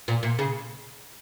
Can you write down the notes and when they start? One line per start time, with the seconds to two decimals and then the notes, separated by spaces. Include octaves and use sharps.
0.08 A#2
0.23 A#2
0.39 C#3